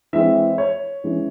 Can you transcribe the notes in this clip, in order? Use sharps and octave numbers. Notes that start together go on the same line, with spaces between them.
E3 G#3 C4 E5
C#5
E3 G#3 C#4